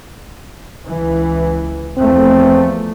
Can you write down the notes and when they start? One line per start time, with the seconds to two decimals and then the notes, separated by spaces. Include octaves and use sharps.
0.86 C#2 E3
1.98 E2 F3 A3 C4